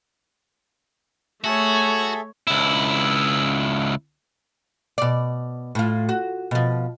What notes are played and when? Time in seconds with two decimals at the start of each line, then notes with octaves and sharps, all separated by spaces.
1.44 A3 F#4 G#4 A4 C#5 E5
2.47 C#2 E4
4.98 B2 D5
5.75 A2 F4
6.09 F#4
6.51 B2 F3